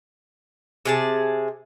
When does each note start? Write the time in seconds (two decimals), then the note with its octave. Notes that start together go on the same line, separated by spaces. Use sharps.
0.85 C3 G#4 A5